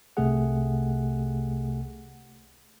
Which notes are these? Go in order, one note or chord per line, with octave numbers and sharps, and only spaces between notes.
C2 C3 A3 G4 G#4 F#5